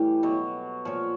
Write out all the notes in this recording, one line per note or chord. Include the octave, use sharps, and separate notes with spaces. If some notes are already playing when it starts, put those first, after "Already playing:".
Already playing: A2 E3 G3 G4
B2 F#3
A#2 F3 C#5